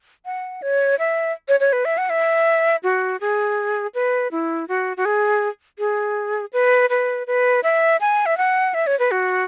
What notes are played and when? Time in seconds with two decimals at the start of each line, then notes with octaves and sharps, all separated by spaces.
0.25 F#5
0.62 C#5
0.99 E5
1.48 C#5
1.60 C#5
1.72 B4
1.85 E5
1.98 F#5
2.10 E5
2.83 F#4
3.20 G#4
3.94 B4
4.31 E4
4.68 F#4
4.97 F#4
5.05 G#4
5.79 G#4
6.53 B4
6.90 B4
7.27 B4
7.63 E5
8.01 G#5
8.26 E5
8.37 F#5
8.74 E5
8.87 C#5
8.99 B4
9.11 F#4